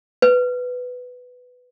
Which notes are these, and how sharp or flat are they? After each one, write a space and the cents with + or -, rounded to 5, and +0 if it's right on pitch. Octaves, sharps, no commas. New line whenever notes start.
B4 +5